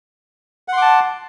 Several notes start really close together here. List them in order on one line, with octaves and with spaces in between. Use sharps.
F#5 C6 D6 A5